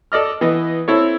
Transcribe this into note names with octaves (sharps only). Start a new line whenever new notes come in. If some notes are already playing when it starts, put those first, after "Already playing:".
A4 D5 D#5 F6
E3 B3 D#5
C4 E4 A4 C#5